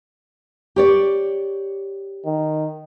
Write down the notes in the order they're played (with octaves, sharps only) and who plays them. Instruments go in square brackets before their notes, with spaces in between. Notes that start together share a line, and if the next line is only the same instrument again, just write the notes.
[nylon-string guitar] G4 C#5 D5
[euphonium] D#3